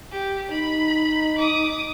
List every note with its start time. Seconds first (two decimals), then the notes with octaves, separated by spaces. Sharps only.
0.12 G4
0.51 D#4 B5
1.39 D6 D#6